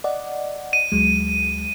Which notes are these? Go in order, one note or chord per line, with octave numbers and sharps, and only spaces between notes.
D5 D#5 F#5
D#7
D2 F#3 G#3